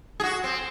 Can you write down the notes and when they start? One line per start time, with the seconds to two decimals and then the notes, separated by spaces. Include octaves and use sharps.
0.20 G#4
0.23 F#4
0.44 C4